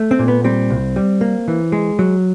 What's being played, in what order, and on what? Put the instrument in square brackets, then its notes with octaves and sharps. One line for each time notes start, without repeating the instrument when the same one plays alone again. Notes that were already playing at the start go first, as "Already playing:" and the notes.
Already playing: [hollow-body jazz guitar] A3
C4
A#2
B3
G3 C4
C2
G3
A#3
E3
G#3
F#3